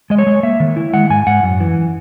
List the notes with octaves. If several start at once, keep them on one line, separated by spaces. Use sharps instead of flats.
G#3 D#5
C#5
G#3
A#3 E5
D#3
E4
G#3 F#5
G#2 G#5
G#2 F#5
F#2
E3